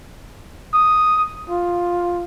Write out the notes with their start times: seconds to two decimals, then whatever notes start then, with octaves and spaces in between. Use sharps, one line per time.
0.74 D#6
1.50 F4